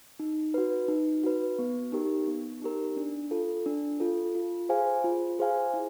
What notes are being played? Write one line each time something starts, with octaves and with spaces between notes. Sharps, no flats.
D#4
F#4 B4
D#4
F#4 B4
B3
D#4 G4 A#4
B3
D#4 G4 A#4
D4
F4 A4
D4
F4 A4
F4
G#4 C5 F5 G#5
F4
G#4 C5 F5 G#5
E4